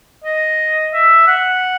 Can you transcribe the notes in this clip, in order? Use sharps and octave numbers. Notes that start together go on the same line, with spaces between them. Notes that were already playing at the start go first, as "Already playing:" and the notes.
D#5
E5
F#5